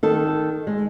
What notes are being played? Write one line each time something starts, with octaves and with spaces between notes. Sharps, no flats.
D#3 A4
G#3